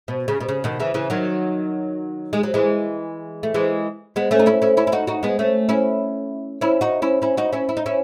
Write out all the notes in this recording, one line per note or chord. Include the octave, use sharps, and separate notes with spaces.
B2
C#3
B2
C#3
B2 D#3
C#3 E3
C#3 E3
D#3 F#3
G#3
F#3
E3 G#3
A3
E3 G#3
G#3 B3
A3 C#4
D#4
C#4 E4
C#4 E4
C#4 E4
E4
D#4 F#4
D#4 F#4
G#3 B3
A3 C#4
C#4 E4
C#4 E4
D#4 F#4
C#4 E4
C#4 E4
D#4 F#4
C#4 E4
E4
D#4
C#4 E4